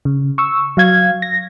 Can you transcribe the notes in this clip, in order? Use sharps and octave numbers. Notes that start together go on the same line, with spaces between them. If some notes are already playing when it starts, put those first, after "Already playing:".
C#3
C#6 E6
F#3 F5 G#6
A#6